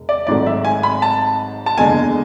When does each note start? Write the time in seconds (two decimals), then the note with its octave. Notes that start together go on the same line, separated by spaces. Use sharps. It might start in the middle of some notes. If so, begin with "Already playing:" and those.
Already playing: E1
0.09 D5
0.27 G#1 G#2 F#3 A3 D5
0.46 E5
0.65 G#5
0.83 B5
1.02 A5
1.66 A5
1.78 F#1 E2 D3 G#3 G#5